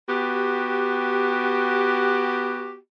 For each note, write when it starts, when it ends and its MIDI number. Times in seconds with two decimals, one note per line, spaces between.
0.08 2.77 59
0.08 2.77 66
0.08 2.77 67